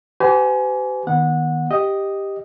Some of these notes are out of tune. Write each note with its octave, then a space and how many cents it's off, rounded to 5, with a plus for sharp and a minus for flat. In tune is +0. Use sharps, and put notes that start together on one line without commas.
G4 -30 B4 +45 G#5 +20
D#3 +0 B3 -25 F#5 -20
G4 +5 D#5 +0